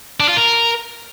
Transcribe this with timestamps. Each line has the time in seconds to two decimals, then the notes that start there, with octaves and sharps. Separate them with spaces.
0.20 D4
0.28 F4
0.37 A#4